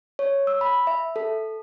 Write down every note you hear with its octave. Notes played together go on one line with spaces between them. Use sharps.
C#5
E6
B5
E5
A4